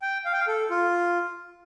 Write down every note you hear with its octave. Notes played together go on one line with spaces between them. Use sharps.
G5
F5
G5
F5
A4
F4